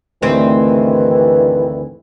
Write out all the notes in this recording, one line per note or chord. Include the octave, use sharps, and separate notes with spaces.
D2 G2 D#3 E3 C4